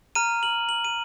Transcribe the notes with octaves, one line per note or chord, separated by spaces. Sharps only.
A#5 F6 D#7
F#7
F#7
D#7